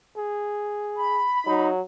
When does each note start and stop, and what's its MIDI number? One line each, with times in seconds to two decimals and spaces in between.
0.17 1.26 68
0.96 1.64 83
1.47 1.81 54
1.47 1.71 63